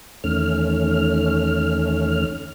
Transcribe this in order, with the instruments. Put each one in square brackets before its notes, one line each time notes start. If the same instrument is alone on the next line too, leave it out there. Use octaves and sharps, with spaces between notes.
[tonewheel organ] E2 D#3 A3 C#4 F6